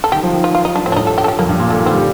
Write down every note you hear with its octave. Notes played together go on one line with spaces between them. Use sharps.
A4
D#3 G4
F3
D#3
F4
F4
D#4
F3 D4
A2 C4
D4
G2 D#4
A4
G4
A4
G4
F2 A#3
G2
A#2
D3 A3
D#3
G3 C4